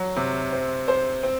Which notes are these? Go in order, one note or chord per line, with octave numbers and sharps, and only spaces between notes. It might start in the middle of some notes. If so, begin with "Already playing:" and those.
Already playing: F#3
C3
C4
C5
C4